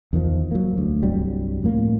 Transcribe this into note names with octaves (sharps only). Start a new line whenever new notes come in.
E2 D#3 F3
F#3 A#3
D2
C2 G2 F#3 G3
F2 A2 A#3